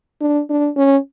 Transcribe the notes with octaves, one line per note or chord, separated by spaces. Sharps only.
D4
D4
C#4